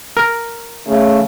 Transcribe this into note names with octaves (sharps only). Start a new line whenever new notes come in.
A#4
C#3 A3